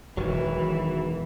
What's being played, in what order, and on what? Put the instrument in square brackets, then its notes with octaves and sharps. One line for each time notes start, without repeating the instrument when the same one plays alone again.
[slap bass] E1 [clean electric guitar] D#3 F#3 [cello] E3